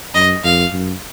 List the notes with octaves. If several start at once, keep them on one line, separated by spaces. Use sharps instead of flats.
F#2 D#5
F2 F5
F#2